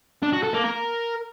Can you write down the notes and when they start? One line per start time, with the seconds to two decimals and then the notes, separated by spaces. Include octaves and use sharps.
0.23 D4
0.33 F#4
0.43 A4
0.54 A#3
0.64 A#4